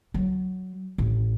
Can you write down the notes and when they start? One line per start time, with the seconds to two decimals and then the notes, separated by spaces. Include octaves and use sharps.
0.14 F#3
0.98 A1